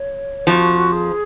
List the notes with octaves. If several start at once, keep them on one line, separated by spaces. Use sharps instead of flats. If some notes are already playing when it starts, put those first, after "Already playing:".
Already playing: C#5
F2 F3 F#4
G#4